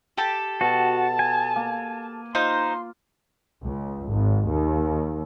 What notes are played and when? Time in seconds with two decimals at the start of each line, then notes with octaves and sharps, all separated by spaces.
0.17 G4 A4
0.61 B2 F#4 A5
1.19 G#5
1.56 A#3
2.35 D#4 F4 C5 C6
3.64 C#2
4.08 G#1
4.48 D#2